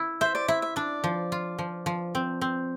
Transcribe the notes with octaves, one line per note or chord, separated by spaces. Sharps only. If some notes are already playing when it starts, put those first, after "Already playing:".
Already playing: E4
C5 E5
D5
E4 E5
E5
D4 D5
F3
F4
F3
F3
C4
C4